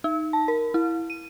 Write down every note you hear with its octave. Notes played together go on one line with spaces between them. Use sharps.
D#4
A5
A#4
E4
D#7